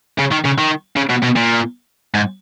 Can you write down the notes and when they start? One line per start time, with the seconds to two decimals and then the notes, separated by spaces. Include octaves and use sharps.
0.19 C#3
0.32 D#3
0.45 C#3
0.58 D#3
0.96 C#3
1.10 B2
1.23 B2
1.36 A#2
2.14 G#2